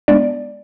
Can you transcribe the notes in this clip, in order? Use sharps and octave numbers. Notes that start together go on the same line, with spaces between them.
G#3 B3 D4 D5